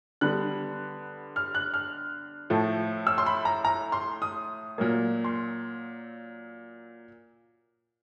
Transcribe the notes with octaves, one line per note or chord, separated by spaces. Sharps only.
D3 G3 B3 F#6
F6
F#6
F6
A2 F3 A3
E6
C6
B5
A#5
A#5
C6
D#6
A#2 F#3 A#3
C6